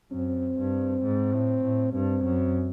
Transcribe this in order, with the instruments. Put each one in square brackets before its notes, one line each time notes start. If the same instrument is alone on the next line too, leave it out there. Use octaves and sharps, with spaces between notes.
[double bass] F#2 [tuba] C4
[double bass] G2
G#2
A2
A2
[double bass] G2 [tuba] C4
[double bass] F#2